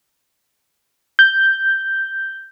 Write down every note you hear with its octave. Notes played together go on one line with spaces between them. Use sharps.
G6